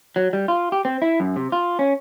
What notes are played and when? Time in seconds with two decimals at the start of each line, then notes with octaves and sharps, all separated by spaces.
0.16 F#3
0.33 G3
0.48 F4
0.72 G4
0.85 C4
1.02 E4
1.20 F#2
1.36 C3
1.52 F4
1.79 C#4